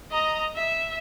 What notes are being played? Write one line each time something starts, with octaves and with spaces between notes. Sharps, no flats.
D#5 A#5
E5